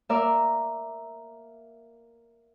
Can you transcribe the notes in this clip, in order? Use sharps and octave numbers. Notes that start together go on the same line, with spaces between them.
A#3 A#4 D5 E5